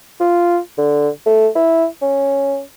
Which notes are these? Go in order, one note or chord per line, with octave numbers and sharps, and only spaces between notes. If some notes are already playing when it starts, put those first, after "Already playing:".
F4
D3
A3
E4
C#4